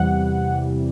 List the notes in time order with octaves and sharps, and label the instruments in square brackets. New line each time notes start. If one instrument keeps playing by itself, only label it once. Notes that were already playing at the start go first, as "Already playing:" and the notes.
Already playing: [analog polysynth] E2 C3 E3 G3 F#5